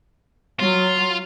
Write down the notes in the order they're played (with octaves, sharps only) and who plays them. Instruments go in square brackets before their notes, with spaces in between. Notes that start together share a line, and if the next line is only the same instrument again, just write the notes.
[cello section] F#3 [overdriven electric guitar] F4